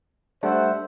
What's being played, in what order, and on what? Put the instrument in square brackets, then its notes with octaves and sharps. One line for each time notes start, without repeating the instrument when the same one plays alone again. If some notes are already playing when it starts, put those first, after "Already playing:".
[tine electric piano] G3 A3 D4 [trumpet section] C5 E5 F#5